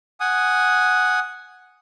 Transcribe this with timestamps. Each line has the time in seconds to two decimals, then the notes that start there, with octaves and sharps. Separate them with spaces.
0.20 F#5 G#5 D#6